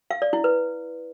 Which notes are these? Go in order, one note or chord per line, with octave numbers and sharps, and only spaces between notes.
F5
D5
E4
B4